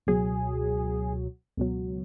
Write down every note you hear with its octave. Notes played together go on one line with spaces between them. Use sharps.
C#2 B2 F#3 G#4
C#2 B2 F#3